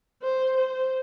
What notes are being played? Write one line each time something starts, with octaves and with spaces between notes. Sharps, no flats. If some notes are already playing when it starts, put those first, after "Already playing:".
C5
C5